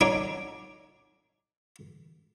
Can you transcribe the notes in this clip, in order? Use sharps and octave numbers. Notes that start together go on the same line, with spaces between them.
D4 D#4 A4 C#5 F#5 D6